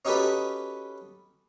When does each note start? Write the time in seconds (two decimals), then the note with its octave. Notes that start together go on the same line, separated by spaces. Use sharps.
0.05 C#4 D#4 F#4 G4 A4 B4